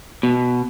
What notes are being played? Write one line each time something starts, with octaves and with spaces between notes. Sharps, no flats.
B2